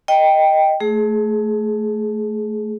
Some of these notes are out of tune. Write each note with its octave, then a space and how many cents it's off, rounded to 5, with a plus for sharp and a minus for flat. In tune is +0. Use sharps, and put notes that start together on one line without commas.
D#5 +0 G5 +0
A3 +0 G#4 +20